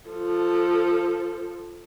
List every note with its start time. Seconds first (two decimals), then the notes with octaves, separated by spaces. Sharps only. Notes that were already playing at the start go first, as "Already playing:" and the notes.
0.10 F3 A4